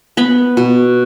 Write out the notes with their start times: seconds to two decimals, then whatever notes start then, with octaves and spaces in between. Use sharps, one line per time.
0.17 B3 B5
0.57 B2